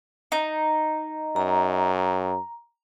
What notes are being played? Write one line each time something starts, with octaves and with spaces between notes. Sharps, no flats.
D#4
F#2 A#5